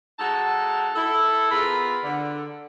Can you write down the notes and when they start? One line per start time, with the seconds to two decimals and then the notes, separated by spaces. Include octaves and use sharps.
0.19 G#3 D#4 F#4 A4 A5
0.95 E4 A4
1.50 B3 F4 G#4 A#4 B5
2.04 D3